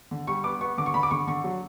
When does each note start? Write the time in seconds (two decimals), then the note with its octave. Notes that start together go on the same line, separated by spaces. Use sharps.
0.11 D3
0.27 G3 C#6
0.44 B3 D6
0.61 B3 C#6
0.78 D3 D6
0.86 C#6
0.94 D3 B5
1.03 D6
1.11 D3 C#6
1.27 D3 C#6
1.44 F#3